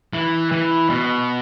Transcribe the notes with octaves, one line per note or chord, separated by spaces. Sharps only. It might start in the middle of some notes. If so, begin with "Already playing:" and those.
E3
E3
B2